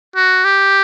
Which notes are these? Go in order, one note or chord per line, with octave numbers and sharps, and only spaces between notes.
F#4
G4